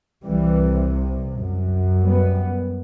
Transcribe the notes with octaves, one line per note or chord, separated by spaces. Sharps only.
C2 C3 E3 G3
F#2
G3 B3